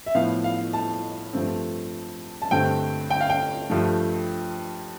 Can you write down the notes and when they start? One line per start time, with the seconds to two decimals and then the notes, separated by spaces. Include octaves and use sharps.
0.06 E5
0.15 A2 F3 B3 F5
0.44 F5
0.73 A5
1.33 G2 F3 A3 C4
2.42 A5
2.51 G2 D3 A3 C4 G5
3.10 G5
3.21 F5
3.30 G5
3.70 G2 F3 A3